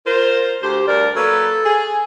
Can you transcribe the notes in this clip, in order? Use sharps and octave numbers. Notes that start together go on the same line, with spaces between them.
F4 A#4 C5
D2 G4 C5
D2 G2 A#4 D5
F#3 A#3 A4 B4
G#4